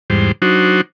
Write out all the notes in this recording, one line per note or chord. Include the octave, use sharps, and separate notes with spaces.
E2 G#2 G3 C5
F#3 D4 D#4 F#4 C5